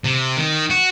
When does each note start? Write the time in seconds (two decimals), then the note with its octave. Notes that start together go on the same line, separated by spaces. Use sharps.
0.04 C3
0.37 D#3
0.70 F#4